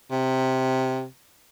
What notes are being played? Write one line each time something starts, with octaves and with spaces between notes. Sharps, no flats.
C3